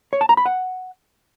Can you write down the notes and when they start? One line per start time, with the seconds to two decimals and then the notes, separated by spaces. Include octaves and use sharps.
0.13 C#5
0.21 A5
0.29 A#5
0.37 B5
0.46 F#5